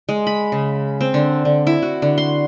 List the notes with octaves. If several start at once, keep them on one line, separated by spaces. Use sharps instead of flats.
G#3
B5
C#3
C4
D3
D3
E4
F#4
D3
C6